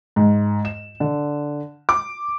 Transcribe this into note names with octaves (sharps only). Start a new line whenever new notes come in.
G#2
E7
D3
D6